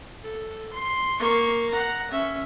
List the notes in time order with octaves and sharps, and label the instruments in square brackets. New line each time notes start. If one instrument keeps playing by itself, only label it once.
[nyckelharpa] A4
C6
A#3 C#6
F#5 A#5
C#4 E5